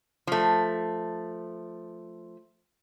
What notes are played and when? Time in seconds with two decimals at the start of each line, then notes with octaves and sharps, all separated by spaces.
0.27 F3 A3